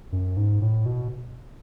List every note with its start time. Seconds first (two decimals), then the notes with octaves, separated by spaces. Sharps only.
0.12 F#2
0.37 G#2
0.61 A2
0.86 B2